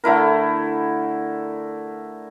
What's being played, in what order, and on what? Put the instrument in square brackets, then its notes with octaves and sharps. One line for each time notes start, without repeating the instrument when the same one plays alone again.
[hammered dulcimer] D3 A3 E4 A#4